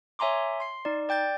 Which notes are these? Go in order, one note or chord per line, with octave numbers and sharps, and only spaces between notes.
C#5 E5 G#5 A#5 C6 D6
C6 C7
D#4 D5
D5 G5 G6 A6